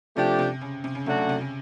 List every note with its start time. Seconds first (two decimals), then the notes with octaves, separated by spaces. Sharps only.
0.17 C3 F3 A3 D4 G4
0.39 C3
0.61 C#3
0.84 C3
0.95 C#3
1.06 C3 F#3 A3 D4 F#4
1.18 C#3
1.29 C3
1.41 C#3